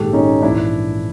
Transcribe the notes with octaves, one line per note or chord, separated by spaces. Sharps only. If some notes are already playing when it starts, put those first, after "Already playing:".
Already playing: A#1 G#2 D#3 G#3 G4 A4
C#4 D#4
A#1 G#2 E3 D4 E4